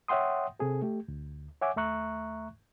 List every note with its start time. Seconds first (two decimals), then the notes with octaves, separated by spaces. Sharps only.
0.08 C#5 E5 F#5 G5 C6 D#6
0.60 C3 C4 G#4 A4
0.82 A3 G4
1.08 D2
1.61 C#5 E5 F#5 G#5 D6
1.76 D#2 A3 E5 A#5 C#6 F#6